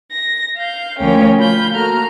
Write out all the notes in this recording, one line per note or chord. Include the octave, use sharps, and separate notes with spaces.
A#6
F5 G6
D2 F3 A#3 C#4 G5
F4 B5 G6
A#3 F#4 A4 A#5 F6